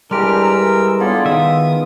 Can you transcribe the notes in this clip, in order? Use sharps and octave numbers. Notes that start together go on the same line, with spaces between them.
E3 G3 G#3 D4 G4 A#4 F6
A#4 E6
B3 D4 F4 G#4 A4 D5
D#3 D#5 E5 D#6